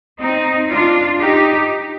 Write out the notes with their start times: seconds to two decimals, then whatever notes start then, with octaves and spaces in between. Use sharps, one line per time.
0.20 C4 D#4
0.70 D4 F4
1.20 D#4 G4